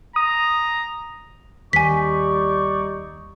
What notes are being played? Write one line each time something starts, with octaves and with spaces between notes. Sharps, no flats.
A#5 D#6
D#2 G3 D#4 D5 G#5 C#6 B6